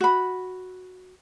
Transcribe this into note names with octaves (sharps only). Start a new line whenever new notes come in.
F#4 B5